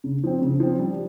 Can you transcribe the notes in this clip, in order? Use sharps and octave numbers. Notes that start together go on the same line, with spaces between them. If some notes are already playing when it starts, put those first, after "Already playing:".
C#3
F3 C4
C#3
F3 C4
G3